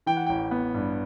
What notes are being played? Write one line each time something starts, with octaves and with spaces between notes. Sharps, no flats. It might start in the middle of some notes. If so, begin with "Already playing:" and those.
E3 G5
F#5
A1 G5
B3
G2